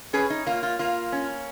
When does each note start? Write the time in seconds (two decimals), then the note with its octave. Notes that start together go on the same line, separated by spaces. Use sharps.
0.13 C#4 G#4 B4
0.30 D#4
0.46 A#3 F4
0.63 F4
0.79 A#3 F4
1.12 C#4